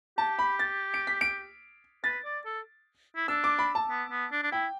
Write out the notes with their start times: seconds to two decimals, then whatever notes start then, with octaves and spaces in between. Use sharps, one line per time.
0.18 G4 A5
0.39 B5
0.59 A6
0.94 D7
1.07 B6
1.21 D7
2.04 B4 A6
2.25 D5
2.45 A4
3.16 E4
3.28 D4 E6
3.44 D6
3.59 B5
3.75 A5
3.90 B3
4.11 B3
4.32 D4
4.43 D4
4.52 E4 G5